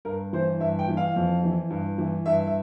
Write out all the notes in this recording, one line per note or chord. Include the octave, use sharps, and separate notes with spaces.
G2 A#4
E3 C5
G2 E5
G5
E3
F5
F2
E3
G2
E3
G2 E5
E5